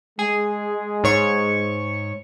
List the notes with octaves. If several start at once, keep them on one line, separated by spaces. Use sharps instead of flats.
G#3 G#4
G#2 C#5 C#6